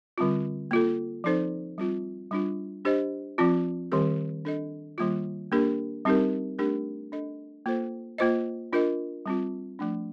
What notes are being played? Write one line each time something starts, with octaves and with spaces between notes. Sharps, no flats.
D3 G3 C4 F4
A#3 F4 A4
F3 C4 D#4 A4 C5
G3 C4 F4
G3 D4 F4
D4 G4 C5 D#5
F3 C4 F4
D#3 G3 C4 G4 A#4
D4 A4 D#5
D#3 G3 A#3 F4
A#3 D4 G4 A#4
G3 C4 D#4 G4 A#4
A3 D4 G4 A#4
D4 A4 D#5
A#3 F4 A4 C5
A#3 F4 C5 D#5
D4 F4 A#4 D#5
G3 C4 F4
F3 A3 D4